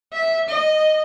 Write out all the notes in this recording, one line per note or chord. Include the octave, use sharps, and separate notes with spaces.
E5
D#5